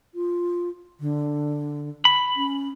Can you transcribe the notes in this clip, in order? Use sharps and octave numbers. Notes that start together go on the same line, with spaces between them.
F4
D3
B5
C#4